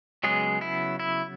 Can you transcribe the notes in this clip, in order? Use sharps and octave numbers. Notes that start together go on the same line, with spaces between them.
C#3 F#3 G#3 B3 G#4
E4
E4